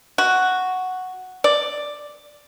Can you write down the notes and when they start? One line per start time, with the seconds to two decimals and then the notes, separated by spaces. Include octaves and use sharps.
0.18 F#4
1.44 D5